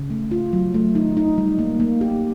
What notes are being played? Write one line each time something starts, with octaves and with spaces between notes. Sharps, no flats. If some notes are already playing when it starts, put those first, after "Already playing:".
Already playing: C#3
A3
F4
F#3
A3
D#4
D#4
G3
A#3
A#3
G4